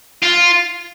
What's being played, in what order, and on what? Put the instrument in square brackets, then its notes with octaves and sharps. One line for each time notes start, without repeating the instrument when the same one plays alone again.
[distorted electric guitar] F4